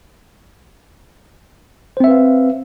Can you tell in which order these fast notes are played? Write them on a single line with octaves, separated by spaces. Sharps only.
C5 C4 E5 B4 F5